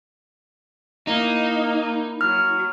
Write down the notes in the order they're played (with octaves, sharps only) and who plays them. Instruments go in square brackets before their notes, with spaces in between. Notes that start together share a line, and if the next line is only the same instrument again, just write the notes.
[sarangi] A#3 [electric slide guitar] D#4 [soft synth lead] E4
[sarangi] F#3 [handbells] F6